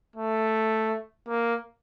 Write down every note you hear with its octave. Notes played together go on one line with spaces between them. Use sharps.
A3
A#3